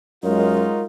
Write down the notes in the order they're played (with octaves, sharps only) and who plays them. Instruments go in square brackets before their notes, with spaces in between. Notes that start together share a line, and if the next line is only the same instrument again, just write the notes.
[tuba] F#2 [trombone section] F#3 D#4 F4 [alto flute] G#3 [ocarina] A#4